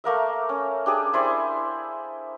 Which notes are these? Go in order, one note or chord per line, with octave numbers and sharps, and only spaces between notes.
A3 A#3 A#4 E5
C#4
D4 G4 G#4
E4 C5 D5 G#5